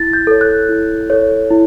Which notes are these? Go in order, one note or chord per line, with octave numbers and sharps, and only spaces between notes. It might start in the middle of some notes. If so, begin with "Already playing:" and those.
Already playing: E4 A6
G6
A4 C#5
F#6
E4
A4 C#5
E4